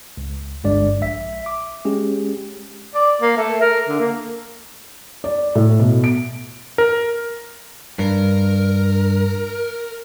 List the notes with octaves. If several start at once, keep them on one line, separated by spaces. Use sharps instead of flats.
C#2
G1 G2 G#3 D4 D5
A#1 E5 B6
D6
G#3 C#4 G4 G#4
D5
A#3
A3
A#4
D3
A#3
D5
A2
B2
D7
A#4
G2 A#4